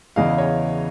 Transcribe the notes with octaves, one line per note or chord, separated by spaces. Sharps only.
E2 C#3 E3 D#5 F5
C#5 D#5